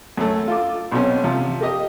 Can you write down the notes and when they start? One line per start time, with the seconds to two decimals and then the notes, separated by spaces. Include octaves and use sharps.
0.17 F#2 A3
0.48 F4 A4 D6
0.92 B1 B2 C4 C#4
1.24 C3 F3
1.61 A#3 G4 D#5